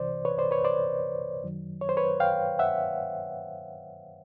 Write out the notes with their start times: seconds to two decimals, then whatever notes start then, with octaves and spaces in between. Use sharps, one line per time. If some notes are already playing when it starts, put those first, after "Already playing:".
Already playing: C2 C3 E3 C5 D5
0.25 B4 C#5
0.38 C5 D5
0.51 B4 C#5
0.64 C5 D5
1.43 F#2 D#3 F#3
1.81 C#5
1.89 C5
1.97 B4 C#5
2.20 F5 G5
2.59 E5 F#5